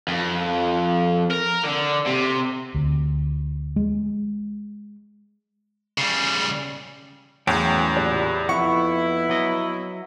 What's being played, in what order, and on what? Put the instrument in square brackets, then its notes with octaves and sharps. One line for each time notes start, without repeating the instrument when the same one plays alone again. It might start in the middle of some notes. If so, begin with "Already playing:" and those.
[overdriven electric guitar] F2
A#4
D3
C3
[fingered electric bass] D2
G#3
[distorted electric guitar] C#3 G3
[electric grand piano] E2 [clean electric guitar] A2 C#3 F#3 [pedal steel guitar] G5 C#6 F#6
[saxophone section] A#2 [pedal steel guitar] E4 G4 D5
[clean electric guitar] F2 [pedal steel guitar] B3 F#5 [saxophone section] E4 [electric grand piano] C#6
[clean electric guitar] F#3 D#5